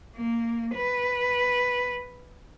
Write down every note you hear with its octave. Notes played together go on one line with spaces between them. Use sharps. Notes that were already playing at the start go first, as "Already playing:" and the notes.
A#3
B4